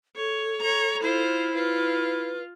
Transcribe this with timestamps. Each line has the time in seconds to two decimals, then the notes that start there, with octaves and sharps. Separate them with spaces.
0.16 A4 C#5
0.60 C#5 A#5
1.03 E4 F4 C5
1.54 F4 B4